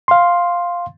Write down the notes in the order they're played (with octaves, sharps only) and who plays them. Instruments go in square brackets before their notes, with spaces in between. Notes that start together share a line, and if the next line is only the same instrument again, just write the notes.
[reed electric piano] F5 C6